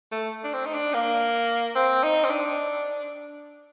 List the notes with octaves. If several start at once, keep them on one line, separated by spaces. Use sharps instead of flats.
A3
D4
C4
D#4
D4
A#3
C4
D#4
C4
D4